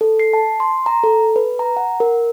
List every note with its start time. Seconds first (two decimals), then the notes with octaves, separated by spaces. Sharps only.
0.01 A4
0.19 C7
0.33 A5
0.60 C6
0.86 A#5
1.04 A4
1.36 B4
1.59 A#5
1.77 F#5
2.00 A#4